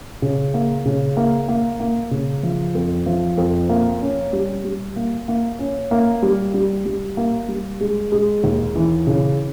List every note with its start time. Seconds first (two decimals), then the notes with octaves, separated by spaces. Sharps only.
0.22 C#3
0.54 A#3
0.85 C#3
1.17 A#3
1.48 A#3
1.80 A#3
2.11 C#3
2.43 F3
2.75 F2
3.06 F3
3.38 F2
3.69 A#3
4.01 C#4
4.33 G3
4.65 G3
4.96 A#3
5.28 A#3
5.59 C#4
5.91 A#3
6.22 G3
6.54 G3
6.85 G3
7.17 A#3
7.48 G3
7.80 G#3
8.12 G#3
8.44 D#2
8.75 E3
9.07 C#3